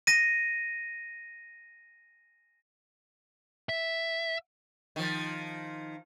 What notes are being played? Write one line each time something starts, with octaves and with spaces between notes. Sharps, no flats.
A#6 D#7
E5
D#3 F3